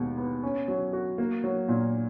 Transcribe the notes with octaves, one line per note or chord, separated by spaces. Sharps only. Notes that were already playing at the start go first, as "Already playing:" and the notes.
Already playing: D#2 B2 G#3
B3
C#4
F#3
F#4
A#3
F#3
A#2